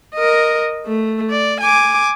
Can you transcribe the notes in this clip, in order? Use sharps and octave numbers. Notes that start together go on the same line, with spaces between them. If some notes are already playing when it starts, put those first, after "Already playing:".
A#4 D#5
A3
D5
G#5 D6